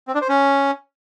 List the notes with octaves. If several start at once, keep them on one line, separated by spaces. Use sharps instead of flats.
C4
D4
C5
C#4